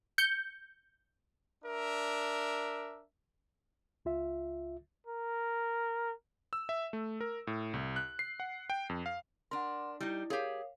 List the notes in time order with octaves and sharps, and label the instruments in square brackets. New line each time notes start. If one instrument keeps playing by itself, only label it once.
[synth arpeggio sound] G6 C#7
[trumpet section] D4 A#4 E5
[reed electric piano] C#2 F4 E5
[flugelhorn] A#4
[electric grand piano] E6
E5
A3
A#4
A2
C2
F#6
C7
F#5
G5
F2
F5
[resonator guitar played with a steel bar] D4 A#4 [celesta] F#5 C6
[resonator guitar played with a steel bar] G3 D#4 [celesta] E4
[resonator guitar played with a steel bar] G4 G#4 [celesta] A#4 C#5 F5